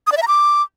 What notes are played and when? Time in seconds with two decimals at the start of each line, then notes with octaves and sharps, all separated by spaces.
0.07 D#6
0.12 D5
0.17 E5
0.22 A#5
0.28 D6